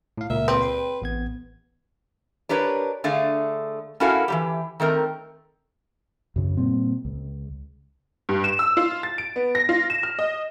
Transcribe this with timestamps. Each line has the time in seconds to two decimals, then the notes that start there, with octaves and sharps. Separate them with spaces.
0.18 A2 F5
0.30 C#2 A#2 A#4 E5
0.48 C4 B4
0.61 G5 C6
1.02 A1 B3 G#6
2.49 D4 G4 A#4 B4 C#5
3.04 D3 A3 G#4 F5
4.00 C#4 E4 F#4 A4 A#4 F5
4.28 E3 G3 G4
4.80 D#3 A3 C4 A#4
6.36 F#2 C#3
6.57 A#2 G3 C4
7.05 C#2
8.29 G2
8.44 E7
8.59 E6
8.77 F4
9.03 A6
9.18 D7
9.36 B3
9.55 A#6
9.69 F4
9.90 E7
10.03 F6
10.19 D#5